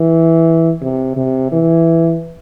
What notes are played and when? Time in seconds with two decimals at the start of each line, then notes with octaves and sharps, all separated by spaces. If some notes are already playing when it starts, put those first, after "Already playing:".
Already playing: E3
0.82 C3
1.16 C3
1.52 E3